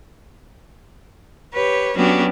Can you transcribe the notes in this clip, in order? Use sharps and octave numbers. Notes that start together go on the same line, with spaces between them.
G4 B4 C#5
F#3 B3 C#4 D4 F#4 G4